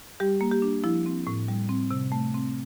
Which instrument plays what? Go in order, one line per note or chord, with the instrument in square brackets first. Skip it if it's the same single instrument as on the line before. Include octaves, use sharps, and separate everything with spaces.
[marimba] G3 G4
A#3
G4
D4
F3 E4
C4
A2
G3
C4
C3
A3
C4